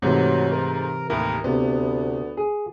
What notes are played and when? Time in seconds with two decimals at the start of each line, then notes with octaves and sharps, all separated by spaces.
0.02 G#2 C3 E3 F#3 A3
0.52 A#4
1.10 D#2 A2 E4 A#4
1.44 D2 C3 B3
2.37 G#4